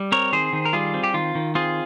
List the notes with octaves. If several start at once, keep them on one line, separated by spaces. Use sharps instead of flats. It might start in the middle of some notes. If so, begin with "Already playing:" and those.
Already playing: G3
C4 A#4 C#5
D#3 G#4 C5
D#3
A#4
G3 F4 G#4
C4
G4
D#3 F4
D#3
C4 F4 G#4